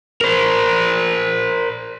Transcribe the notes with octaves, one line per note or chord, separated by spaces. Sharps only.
A#4 C5